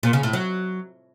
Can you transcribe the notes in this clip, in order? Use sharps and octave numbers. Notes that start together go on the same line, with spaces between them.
A#2
C#3
A2
F#3